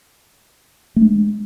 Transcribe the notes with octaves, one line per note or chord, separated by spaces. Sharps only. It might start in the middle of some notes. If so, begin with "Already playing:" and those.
G#3 A3 D4